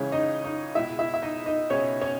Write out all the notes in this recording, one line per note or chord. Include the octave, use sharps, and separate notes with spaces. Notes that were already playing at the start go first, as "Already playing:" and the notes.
Already playing: C#2 C#3 E3 G#3 C#4 C#5
D#4 D#5
D#4 D#5
C#2 B2 G#3 E4 E5
E4 E5
E5
D#4 D#5
D#4 D#5
C#2 B2 G#3 C#4 C#5
C#4 C#5